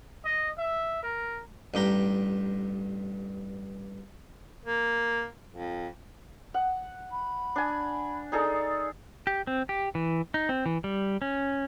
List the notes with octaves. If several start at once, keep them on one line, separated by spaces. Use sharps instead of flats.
D#5
E5
A#4
A1 G2 G4 A#5
A#3
F2
F#5
B5
D4 G#5
D#4 G#4 A4 D5
G4
C4
G4
E3
D#4
C4
E3
G3
C#4